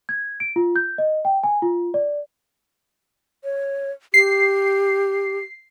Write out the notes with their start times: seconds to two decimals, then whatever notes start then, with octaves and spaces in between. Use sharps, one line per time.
0.09 G#6
0.40 D7
0.56 F4
0.76 G6
0.98 D#5
1.25 G5
1.44 G#5
1.62 F4
1.94 D5
3.44 C#5
4.14 G4 C7